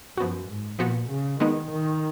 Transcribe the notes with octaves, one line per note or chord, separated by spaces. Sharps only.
F#2 F3 B3 F#4
G#2
A#2 F3 B3 F#4
C#3
D#3 G#3 B3 D#4
D#3